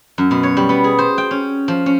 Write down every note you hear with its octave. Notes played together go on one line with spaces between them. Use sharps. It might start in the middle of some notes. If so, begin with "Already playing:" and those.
F#2
B2
C#5
G3
B3
G#4
C5
G5
C#4
F3
C#4